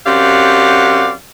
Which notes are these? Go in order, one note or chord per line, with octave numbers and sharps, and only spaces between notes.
F#2 C4 G4 D5 F5 F#5